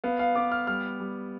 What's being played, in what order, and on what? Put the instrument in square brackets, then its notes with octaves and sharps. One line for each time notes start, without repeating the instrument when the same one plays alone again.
[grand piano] B3 F5
F5
B3 D6
F6
G3 F6
G3